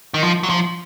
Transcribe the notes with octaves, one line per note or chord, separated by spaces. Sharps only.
D#3
F3
F#3
F3